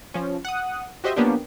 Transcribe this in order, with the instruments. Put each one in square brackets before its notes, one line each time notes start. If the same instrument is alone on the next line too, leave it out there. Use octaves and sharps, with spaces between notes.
[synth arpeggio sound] F3 C#4
F#5 D#6
F#4 G4 C5 D#5 E5
F3 A#3 B3 C#4 D4 G4